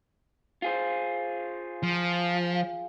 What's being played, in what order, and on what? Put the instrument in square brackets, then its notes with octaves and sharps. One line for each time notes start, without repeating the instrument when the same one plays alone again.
[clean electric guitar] F4 G#4 C5
[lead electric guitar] F3